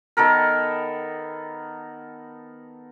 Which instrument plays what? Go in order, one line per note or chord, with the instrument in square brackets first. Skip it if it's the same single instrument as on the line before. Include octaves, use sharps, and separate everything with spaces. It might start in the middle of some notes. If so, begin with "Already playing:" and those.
[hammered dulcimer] D#3 B3 A4 A#4